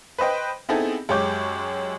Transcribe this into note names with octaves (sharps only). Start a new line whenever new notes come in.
B4 C5 D#5 G5
B3 C4 D#4 E4 G#4 A4
F#2 G#3 G4 C#5 D6 G6